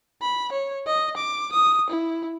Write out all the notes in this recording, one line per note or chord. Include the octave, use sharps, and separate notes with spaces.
B5
C#5
D#5
D6
D#6
E4